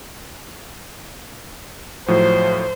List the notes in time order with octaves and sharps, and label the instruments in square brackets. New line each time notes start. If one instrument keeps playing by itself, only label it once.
[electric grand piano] A2 F3 F#3 [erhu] C5